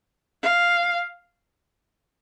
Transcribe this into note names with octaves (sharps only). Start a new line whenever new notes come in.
F5